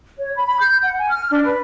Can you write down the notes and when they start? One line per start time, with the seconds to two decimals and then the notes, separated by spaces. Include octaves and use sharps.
0.18 C#5
0.35 B5
0.47 B5
0.61 G6
0.83 F#5
0.98 G#5
1.10 F6
1.31 D4
1.45 B4